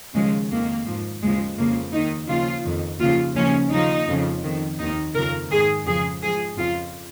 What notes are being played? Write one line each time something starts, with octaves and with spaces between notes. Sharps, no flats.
D#2 C#3 F3 G#3
F2 D#3 A#3
G#2 F3
D#2 C#3 F3 G#3
F2 C#3 F3 A#3
D#2 D#3 D#4
D#2 C#3 F3 F4
F2 D#3
D#2 C#3 F3 F4
D#2 C#3 F3 C#4
D#2 C#3 F3 D#4
F2 C#3 F3
F2 D#3
D#2 D#3 D#4
F2 C#3 F3 A#4
G#2 D#3 G#4
F2 C#3 F3 G#4
G#2 F3 G#4
F2 C#3 F3 F4